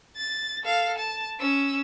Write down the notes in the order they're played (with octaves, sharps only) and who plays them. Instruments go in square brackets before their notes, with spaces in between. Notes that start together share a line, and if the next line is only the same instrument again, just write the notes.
[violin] A6
A4 F5
A5
C#4 E6